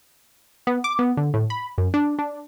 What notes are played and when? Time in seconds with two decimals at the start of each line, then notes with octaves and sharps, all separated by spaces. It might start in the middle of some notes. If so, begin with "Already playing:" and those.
0.67 B3
0.84 D6
0.99 B3
1.17 D3
1.34 A2
1.50 B5
1.78 F#2
1.94 D4
2.19 D4